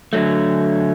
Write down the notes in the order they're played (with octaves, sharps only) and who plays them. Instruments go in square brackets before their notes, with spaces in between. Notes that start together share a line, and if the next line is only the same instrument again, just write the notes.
[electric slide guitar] D3 F#3 A3